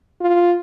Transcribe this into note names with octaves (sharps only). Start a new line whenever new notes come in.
F4